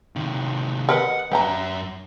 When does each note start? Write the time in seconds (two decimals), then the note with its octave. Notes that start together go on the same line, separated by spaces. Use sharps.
0.16 C3 D#3
0.89 A#4 B4 D#5 F#5
1.31 F#2 B4 E5 G5 A#5